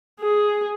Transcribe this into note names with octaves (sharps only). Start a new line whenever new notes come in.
G#4